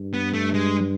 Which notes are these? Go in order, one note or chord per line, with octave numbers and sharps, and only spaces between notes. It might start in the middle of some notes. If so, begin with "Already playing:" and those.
Already playing: G2
B3
A3
G#3